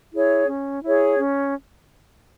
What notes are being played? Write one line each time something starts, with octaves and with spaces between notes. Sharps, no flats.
E4 G#4 C#5
C#4
E4 G#4 C#5
C#4